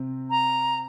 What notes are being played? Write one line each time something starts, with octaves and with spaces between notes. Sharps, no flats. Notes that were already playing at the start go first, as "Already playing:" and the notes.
Already playing: C3 C4
A#5